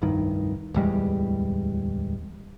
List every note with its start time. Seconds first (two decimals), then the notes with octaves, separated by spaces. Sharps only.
0.02 F1 C2 G2 D#3
0.74 D1 E2 G3 G#3